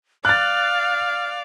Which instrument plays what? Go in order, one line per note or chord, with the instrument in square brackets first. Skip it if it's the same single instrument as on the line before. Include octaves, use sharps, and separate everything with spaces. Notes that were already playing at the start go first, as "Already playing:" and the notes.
[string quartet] D5 F5 [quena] F6 [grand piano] F#6 A6